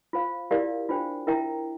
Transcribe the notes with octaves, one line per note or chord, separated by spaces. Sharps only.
F4 C5 F5
E4 G4 A#4 D5 F5
D4 F4 C5 G5
E4 A#4 E5 G5 A#5